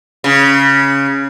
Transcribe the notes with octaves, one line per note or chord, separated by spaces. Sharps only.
C#3